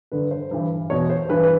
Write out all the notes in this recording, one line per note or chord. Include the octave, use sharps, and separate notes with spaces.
G2 D3 B4
C5
G2 E3
E2 B2 C#5
C5
G2 E3 B4
B4